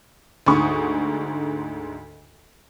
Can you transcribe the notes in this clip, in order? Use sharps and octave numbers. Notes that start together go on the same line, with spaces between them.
D2 G#2 D3 D#4 C#6 D#6